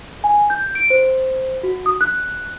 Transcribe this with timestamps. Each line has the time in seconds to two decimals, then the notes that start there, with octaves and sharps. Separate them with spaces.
0.24 G#5
0.50 G6
0.75 D7
0.90 C5
1.63 F#4
1.86 D#6
2.01 F#6